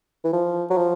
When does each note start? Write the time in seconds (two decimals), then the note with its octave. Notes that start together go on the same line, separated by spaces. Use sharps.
0.24 E3
0.33 F3
0.70 F#3
0.77 F3